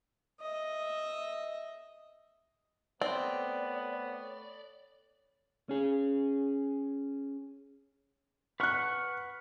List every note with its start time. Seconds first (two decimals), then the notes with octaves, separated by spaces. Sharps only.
0.41 D#5 E5
3.02 A3 B3 C4 A4 C#5 D5
5.69 C#4 G#4
8.60 B4 F#5 C#6 F6 F#6